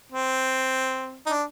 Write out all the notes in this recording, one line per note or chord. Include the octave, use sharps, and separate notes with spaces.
C4
D#4
D4